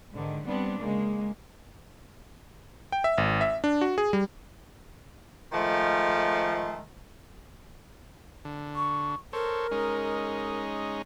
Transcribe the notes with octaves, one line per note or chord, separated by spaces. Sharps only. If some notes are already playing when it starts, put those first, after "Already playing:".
G#2 D3 D#3
G3 B3 C4 D4
C#3 G#3 A#3
G5
E5
G#1
E5
D4
F#4
G#4
G3
D#3 F3 G#3 A3
D3
C#6
A4 A#4 C5 C#5
G#3 C#4 D#4